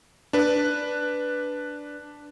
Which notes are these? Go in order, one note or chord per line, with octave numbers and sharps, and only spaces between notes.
D4 B4